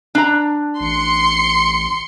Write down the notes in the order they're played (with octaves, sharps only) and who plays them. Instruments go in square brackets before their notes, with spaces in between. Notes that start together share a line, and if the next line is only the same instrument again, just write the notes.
[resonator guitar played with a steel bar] D4 A#5
[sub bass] A1 [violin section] C6 C#7